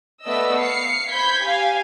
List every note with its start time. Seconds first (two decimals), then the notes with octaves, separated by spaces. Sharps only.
0.24 A3 B3 B4 D5 D#5 E6
0.56 F5 C7 C#7
1.10 C5 B5 G6 G#6 B6
1.42 G4 F5 G#5